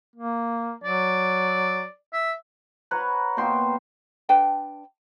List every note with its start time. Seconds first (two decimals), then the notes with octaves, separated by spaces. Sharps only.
0.16 A#3
0.84 F#3 D5
2.13 E5
2.91 B4 C#5 F#5 A#5
3.37 B2 A#3 G5 C6
4.29 D4 B4 G5 A5